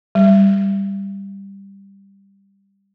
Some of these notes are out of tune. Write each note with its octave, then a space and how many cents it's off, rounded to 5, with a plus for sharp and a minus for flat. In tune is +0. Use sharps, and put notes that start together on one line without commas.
G3 +10